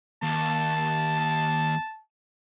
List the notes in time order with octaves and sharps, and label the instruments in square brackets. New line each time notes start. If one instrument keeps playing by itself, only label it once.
[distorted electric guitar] D#2 [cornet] A5